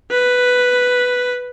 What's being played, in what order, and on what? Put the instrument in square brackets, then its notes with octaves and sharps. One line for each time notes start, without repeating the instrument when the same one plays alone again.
[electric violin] B4